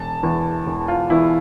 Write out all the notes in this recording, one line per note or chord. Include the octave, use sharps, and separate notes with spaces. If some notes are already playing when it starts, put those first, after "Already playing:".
Already playing: E1 A5
E2 E3
E1
F4
E2 E3 E4